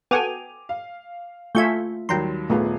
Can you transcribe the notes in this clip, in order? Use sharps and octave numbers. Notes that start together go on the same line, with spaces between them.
B3 F#4 A4 G5 G#5 D6 D#7 F7
F5
A3 F4 E5 G#5 C#6 G6
D#2 F#3 G3 G5 A#5 C6
D#1 A3 B3 F4 G#4